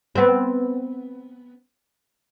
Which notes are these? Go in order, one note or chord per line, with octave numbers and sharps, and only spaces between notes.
B3 C4